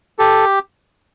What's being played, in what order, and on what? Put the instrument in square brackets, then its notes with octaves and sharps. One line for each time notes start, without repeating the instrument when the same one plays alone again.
[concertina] G4 A4